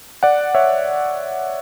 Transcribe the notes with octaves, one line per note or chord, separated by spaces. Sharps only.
D5 F#5
C#5 E5